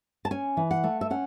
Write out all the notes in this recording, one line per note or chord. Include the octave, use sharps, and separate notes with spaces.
A5
C#4 G#5
E3
F#5
A3
E5
C#4 F#5